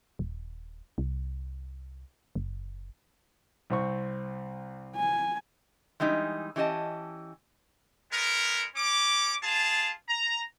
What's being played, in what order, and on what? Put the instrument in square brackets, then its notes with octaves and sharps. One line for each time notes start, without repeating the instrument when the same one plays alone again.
[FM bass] D#1
C2
F#1
[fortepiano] C2 C4 C#6
[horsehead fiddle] G#5
[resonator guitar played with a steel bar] E3 G3 G#3 D#4
E3 C#4 G4 D#5 A5
[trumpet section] G#3 B3 A#4
C#4 D6
F4 G#4 A5
A#5